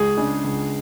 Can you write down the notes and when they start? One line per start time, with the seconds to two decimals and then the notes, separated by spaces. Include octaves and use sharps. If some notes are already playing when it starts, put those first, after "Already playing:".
Already playing: C#2 G#4
0.17 C#3 G#3 D4
0.44 C#2